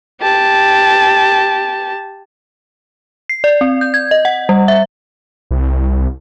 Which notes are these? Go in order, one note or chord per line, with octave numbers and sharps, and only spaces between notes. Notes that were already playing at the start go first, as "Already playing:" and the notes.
G4 A5
C7
D5
C4
G6
G#6
D#5
F#5
G3
E5
C2